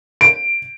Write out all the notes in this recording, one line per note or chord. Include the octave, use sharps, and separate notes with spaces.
D7